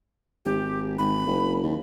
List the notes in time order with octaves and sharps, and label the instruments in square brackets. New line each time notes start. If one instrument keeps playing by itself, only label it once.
[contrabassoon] G#1 [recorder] G4
[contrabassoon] G#1 [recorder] B5
[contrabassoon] F#1
D#2